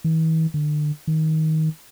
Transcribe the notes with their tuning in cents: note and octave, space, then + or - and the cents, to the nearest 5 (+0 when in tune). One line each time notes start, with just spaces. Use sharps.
E3 -45
D3 +30
D#3 +20